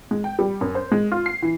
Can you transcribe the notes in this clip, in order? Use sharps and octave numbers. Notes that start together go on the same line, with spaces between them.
G#3
G5
G3
F#2
C5
G#3
F4
C7
E3